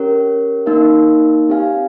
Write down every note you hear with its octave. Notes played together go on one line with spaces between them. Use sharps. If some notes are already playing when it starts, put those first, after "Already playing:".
Already playing: C#4 G4 A#4 C#5
A#3 D#4 A#4 F5
C4 G4 C#5 F5 G#5